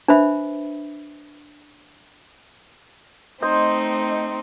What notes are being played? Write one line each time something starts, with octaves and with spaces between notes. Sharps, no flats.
D4 B4 C5 E5 B5
A3 C4 D#4 C5 D#5